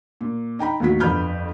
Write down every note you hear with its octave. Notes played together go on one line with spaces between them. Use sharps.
A#2
D#4 G5 A#5 B5
D#2 A2 D#3 F#4 B6
G1 F2 B4 B5 F6 G6